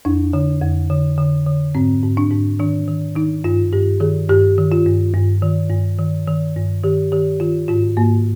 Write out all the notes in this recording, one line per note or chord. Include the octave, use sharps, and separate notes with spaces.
F2 D4
D3
F2
D3
D3
D3
G#2 C4
G#2
D4
G#2
D#3 D4
D#3
D#3 D#4
G2 F4
G2 G4
D#3 G#4
G2 G4
D#3
F4
G2
G2
D#3
G2
D#3
D#3
G2
D#3 G4
D#3 G4
D#3 F4
G#2 F4
G#2 A#3